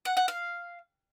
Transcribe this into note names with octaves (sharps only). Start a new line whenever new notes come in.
F#5
F#5
F5